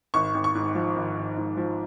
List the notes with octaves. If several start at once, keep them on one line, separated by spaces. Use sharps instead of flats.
G#1 C#6
G#1
C#6
G#2
F3
G#1
G#1
G#2
F3